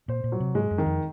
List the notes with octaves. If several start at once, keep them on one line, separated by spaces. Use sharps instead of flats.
A#2 C5
A#2
F#3
C3
G#2 G#3
F#2
D#3
F2